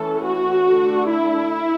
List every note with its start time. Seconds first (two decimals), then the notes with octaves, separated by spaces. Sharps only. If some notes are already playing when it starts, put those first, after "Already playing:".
Already playing: E3 A3 C#4 A4
0.23 F#4
0.67 D3 A3 D4
1.10 E4